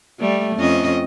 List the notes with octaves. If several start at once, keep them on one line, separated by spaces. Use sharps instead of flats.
G3 A3
F2 C#4 D#5